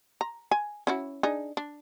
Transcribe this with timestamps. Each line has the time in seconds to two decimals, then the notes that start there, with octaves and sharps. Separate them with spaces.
0.21 A#5
0.51 G#5
0.87 C#4 E4 F#4
1.23 D4 D#4 G#4
1.57 D4